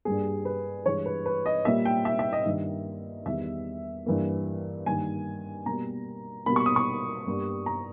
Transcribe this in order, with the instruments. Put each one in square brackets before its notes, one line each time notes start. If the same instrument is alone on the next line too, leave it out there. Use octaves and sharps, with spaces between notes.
[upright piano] G2 G3 A#3 G#4
B4
G2 E3 G#3 C#5
B4
B4
D#5
A#2 G3 A#3 E5
G5
E5
E5
D#5
G2 D#3 A#3
E2 D#3 G3 E5
G2 E3 A#3
G2 D#3 G3 A#3 G#5
B2 G3 A#3 A#5
B2 G3 A#3 B5
C#6
D#6
C#6
G2 G3 A#3
A#5